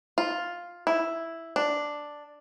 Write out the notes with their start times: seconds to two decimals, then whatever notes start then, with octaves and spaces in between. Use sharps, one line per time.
0.18 F4
0.87 E4
1.56 D4